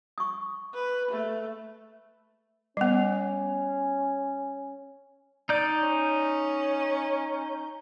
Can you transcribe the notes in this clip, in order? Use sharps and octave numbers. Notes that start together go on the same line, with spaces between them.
C#6 D#6
B4
A3
G3 B3 C#4
D#4 D5 G6
C#4